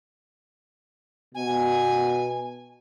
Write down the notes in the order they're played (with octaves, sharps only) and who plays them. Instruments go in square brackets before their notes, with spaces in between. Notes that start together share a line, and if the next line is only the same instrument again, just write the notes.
[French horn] B2 [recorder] G#5